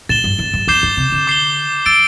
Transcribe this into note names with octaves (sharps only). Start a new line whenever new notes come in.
A2 A6 E7 G7
G2
E2
G2
E2 D6 G6 C7 E7 G7
G2
C3
D3
D6 C7 G7
E3 E6 A6 D7 G7